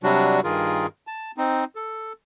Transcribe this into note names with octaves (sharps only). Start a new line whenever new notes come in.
C3 F#3 G3 D4 F#4
G2 D#3 F4 G#4 A#4
A5
C4 D#4
A4